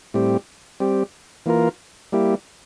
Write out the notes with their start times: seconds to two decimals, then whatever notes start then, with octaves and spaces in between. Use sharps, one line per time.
0.14 A2 G3 C4 G4
0.80 G3 C4 G4
1.46 E3 A#3 F4 A#4
2.12 G3 A#3 E4 G4